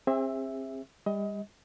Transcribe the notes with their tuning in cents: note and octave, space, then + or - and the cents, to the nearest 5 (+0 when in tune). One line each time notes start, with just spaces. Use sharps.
C4 +30 G#4 -35 E5 +0
G3 +35 D#5 +25